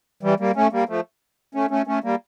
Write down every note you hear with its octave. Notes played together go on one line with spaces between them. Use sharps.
E3 G3
G3 A#3
A3 C#4
G3 A#3
F3 A3
A3 C#4
A3 C#4
A3 C#4
G3 A#3